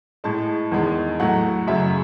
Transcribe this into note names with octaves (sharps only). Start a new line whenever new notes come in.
A2 G#3 A5
E2 D#3 G#3
A2 F#3 A3 F#5
F#2 C#3 F#3 E5